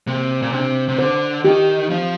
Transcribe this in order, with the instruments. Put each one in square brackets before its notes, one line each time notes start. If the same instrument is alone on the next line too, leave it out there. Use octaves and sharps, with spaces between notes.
[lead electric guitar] C3 [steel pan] A#3
[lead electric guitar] A#2
[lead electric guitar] C3 [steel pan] D4
[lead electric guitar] C3
[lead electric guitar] D3 [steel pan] C5
[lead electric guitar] D#3 [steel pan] G4
[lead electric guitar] F3 [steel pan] C4